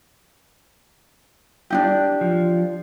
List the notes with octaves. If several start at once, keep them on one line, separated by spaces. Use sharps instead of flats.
D4 D#4 G4
F3